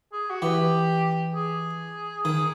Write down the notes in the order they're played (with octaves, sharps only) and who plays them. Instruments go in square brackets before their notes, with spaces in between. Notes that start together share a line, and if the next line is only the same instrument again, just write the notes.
[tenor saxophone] G#4
F#4
[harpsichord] E3 [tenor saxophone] G4
[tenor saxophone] G#4
[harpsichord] D#3